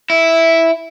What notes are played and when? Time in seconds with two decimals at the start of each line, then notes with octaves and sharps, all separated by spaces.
0.10 E4